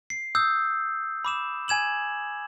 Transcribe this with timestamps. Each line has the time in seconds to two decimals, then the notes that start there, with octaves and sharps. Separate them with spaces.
0.10 C7
0.35 D#6 E6 G6
1.25 B5 D6 E7
1.68 G#5 G#6 E7 F#7